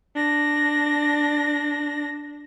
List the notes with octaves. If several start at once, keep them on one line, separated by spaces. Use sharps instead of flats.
D4 A#6